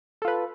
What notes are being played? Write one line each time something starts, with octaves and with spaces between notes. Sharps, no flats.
F4 A4 B4